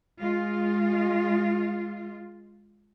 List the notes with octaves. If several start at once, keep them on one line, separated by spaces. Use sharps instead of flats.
G#3 F4